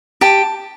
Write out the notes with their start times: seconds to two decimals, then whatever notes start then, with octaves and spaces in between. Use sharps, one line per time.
0.21 G4 A5